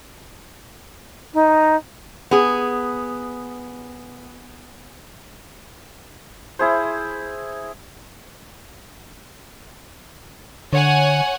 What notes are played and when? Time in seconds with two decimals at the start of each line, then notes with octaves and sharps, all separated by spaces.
1.34 D#4
2.31 B3 G#4
6.59 E4 G#4 C5
10.73 D3 C#5 F#5 G#5